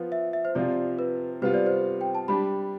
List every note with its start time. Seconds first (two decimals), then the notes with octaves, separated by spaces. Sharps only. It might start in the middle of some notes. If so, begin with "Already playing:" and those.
Already playing: F3 B3 F4
0.12 E5
0.33 E5
0.45 C5
0.55 C3 F3 C4 F4 D5
0.99 B4
1.42 C3 G3 B3 F4 C5
1.54 D5
1.66 C5
2.01 G5
2.15 A5
2.28 G3 D4 G4 B5